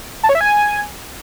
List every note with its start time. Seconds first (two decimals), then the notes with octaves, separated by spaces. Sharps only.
0.23 A5
0.29 C#5
0.35 E5
0.41 G#5